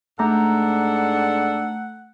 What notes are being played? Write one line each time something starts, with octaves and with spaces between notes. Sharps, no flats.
G#2 A3 D4 A4 F#5 A#5